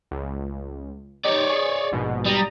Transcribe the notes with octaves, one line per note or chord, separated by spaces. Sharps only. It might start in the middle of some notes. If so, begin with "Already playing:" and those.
C#2
D#4 G4 C#5 D5
G#4 C#6
A#1 G#2 B2
G3 A#5 D#6